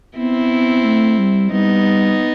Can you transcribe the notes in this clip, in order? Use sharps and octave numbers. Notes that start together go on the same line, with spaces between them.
B3 C4 E4
A3
G3
G3 B3 D#4